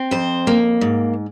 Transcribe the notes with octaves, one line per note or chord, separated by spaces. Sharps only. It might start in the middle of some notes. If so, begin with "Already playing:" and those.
Already playing: C4
F2 C5
A#3
G#2